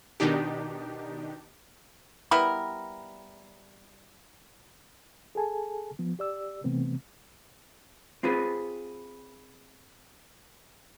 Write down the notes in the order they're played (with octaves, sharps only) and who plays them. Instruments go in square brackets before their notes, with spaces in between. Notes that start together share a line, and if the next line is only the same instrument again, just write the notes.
[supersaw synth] B2 D#3 D4 D#4 G4
[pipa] G3 B3 E4 A#4
[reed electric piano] G#4 A4 G#5 A5
F3 B3
G4 D5 E6
C3 E3 A3 B3 C4
[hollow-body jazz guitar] C4 F4 G#4 B4